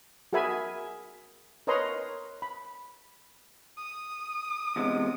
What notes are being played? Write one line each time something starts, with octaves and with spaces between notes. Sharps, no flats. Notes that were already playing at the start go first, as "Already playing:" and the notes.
F#4 G#4 A#4 E5 G#5 B5
A#4 B4 C#5 D#5 A#5 C6
B5
D#6
E2 C3 G#3